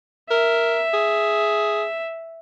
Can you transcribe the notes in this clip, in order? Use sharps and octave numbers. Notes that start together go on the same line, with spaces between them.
A#4 E5
G#4